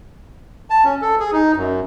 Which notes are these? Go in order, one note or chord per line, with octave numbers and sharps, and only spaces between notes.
A5
C#4
A4
G#4
D#4
F#2